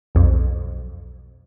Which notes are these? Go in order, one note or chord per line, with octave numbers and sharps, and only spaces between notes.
B1 F2